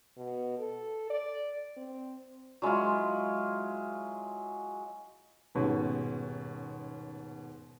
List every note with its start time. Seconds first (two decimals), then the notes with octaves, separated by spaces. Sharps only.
0.17 B2
0.59 A4
1.10 D5
1.77 C4
2.62 F#3 G#3 E4 F4
5.55 D#1 G#2 B2 C#4